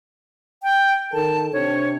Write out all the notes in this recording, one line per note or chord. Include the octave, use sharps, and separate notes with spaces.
G5
D#3 A4 A#4 A5
C3 C4 D4 C#5